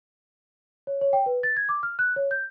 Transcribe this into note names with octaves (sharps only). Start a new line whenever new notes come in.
C#5
C#5
G5
B4
A6
G#6
D6
F6
F#6
C#5
G6